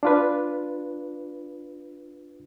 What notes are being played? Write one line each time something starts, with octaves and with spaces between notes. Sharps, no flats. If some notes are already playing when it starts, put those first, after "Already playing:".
D4 F4 B4